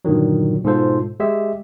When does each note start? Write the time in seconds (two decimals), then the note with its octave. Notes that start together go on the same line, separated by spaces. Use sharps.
0.05 G2 A#2 D3 D#3 F#3
0.64 G#2 B2 F4 A4 C5
1.20 G#3 G4 E5